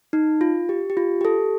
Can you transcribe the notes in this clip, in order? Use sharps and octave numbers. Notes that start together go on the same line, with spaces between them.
D#4
F4
G4
G4
F4
G4
A4